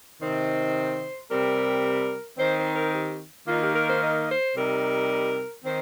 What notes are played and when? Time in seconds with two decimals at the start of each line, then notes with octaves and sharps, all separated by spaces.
0.20 C3 D#3 C4 D#4 C5
1.29 C3 G3 C4 A#4
2.37 D#3 C4 D#4 C5
2.56 C5
2.74 A#4
2.92 G4
3.46 D#3 A#3 D#4 F4
3.60 G4
3.73 A#4
3.87 C5
4.01 D#5
4.28 C5
4.55 C3 G3 D#4 A#4
5.64 D#3 C4 D#4 C5